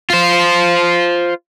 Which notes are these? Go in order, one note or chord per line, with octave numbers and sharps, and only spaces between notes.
F4 C5